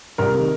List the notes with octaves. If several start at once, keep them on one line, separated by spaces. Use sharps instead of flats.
C2 A#4
C3 D#3